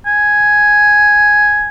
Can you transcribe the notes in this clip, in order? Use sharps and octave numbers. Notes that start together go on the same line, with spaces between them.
G#5